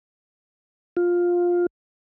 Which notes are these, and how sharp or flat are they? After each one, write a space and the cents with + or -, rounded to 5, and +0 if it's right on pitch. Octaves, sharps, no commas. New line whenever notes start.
F4 +10